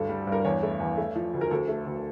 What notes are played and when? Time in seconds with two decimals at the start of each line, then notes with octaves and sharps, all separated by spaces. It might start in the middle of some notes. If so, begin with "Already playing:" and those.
Already playing: D2 G2 A4
0.09 G3
0.27 G2
0.32 A#4
0.45 E2 C#5
0.63 A3
0.80 E2
0.98 A3
1.16 F3
1.34 D2
1.41 A#4
1.51 D2 A4
1.68 A3
1.86 D2